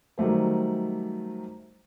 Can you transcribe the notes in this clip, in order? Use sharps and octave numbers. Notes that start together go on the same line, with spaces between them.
D#3 F#3 G3 A3 C5